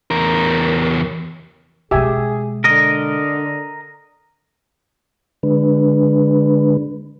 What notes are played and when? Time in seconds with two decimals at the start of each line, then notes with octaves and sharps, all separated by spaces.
0.11 E2 A#4
1.91 B2 G#3 G4 G#4 E5 G#5
2.64 D3 A#4 D#5
5.43 D3 G#3 D4 B4